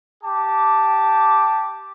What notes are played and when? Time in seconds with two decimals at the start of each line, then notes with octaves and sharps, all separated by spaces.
0.23 G4 A5 D6